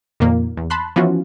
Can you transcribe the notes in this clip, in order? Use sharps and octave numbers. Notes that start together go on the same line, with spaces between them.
F2 A#2 D#3 A#3
E2
A5 B5 C6 F#6
E3 F3 B3 C#4 F4 F#4